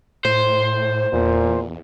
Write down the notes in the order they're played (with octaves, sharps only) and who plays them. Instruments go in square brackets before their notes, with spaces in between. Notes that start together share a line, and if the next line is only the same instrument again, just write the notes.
[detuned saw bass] A2 [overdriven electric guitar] C5
[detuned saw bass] E2 [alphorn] A#2